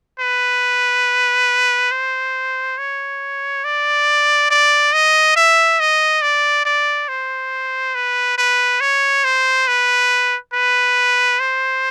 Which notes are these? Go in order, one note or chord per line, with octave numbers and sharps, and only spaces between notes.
B4
C5
C#5
D5
D5
D#5
E5
D#5
D5
D5
C5
B4
B4
C#5
C5
B4
B4
C5